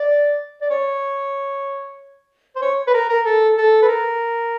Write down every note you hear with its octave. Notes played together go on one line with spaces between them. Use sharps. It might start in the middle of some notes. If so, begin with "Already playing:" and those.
Already playing: D5
D5
C#5
C5
C#5
B4
A#4
A#4
A4
A4
B4
A#4